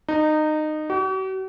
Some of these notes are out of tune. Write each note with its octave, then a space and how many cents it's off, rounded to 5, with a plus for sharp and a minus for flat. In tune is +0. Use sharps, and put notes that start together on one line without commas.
D#4 -20
F#4 +45